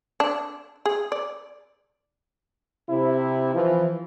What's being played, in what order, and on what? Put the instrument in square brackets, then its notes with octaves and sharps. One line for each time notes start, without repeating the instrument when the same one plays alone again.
[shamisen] D4
G#4
D5
[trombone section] C3 E4
E3 F3